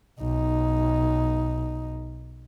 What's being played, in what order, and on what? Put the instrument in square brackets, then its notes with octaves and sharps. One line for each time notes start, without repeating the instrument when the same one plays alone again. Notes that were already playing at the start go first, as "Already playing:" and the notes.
[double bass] B1 D#4